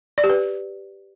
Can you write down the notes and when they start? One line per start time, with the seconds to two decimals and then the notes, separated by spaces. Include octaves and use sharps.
0.18 D5
0.24 G4
0.30 B4